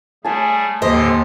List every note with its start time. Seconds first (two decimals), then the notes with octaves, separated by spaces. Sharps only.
0.25 G3 A3 G#4 G#5 A5
0.82 D#2 A2 D3 G4 C5 D#5